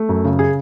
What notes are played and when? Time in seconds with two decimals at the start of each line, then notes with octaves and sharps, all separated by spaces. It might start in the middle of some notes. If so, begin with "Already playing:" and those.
Already playing: A3
0.09 F#2
0.24 C#3
0.39 G#4